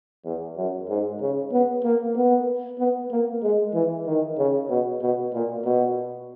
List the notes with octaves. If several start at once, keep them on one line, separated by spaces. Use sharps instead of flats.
E2
F#2
G#2
C#3
B3
A#3
B3
B3
A#3
G#3
E3
D#3
C#3
B2
B2
A#2
B2